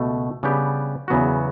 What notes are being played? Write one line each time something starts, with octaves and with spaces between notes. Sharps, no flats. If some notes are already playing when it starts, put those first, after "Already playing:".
Already playing: C#2 B2 A3
C#3 G3 B3 D4 G4
E2 C#3 F#3 B3 F#4